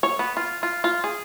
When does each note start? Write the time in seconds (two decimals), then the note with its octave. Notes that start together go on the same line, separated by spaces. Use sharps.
0.03 C#5
0.19 B3
0.37 F4
0.63 F4
0.84 F4
1.04 G#4